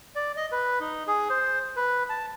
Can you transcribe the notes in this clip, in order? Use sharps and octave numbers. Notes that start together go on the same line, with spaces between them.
D5
D#5
B4
D#4
G#4
C5
B4
A5